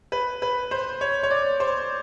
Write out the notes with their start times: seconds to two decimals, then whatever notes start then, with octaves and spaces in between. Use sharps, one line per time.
0.12 B4
0.42 B4
0.71 C5
1.01 C#5
1.23 C#5
1.31 D5
1.60 C5